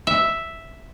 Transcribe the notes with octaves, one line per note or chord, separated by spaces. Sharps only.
E5